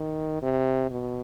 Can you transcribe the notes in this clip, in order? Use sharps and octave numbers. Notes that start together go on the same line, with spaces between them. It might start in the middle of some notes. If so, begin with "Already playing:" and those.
Already playing: D#3
C3
B2